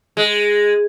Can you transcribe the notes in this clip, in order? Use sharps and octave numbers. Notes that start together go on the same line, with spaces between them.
G#3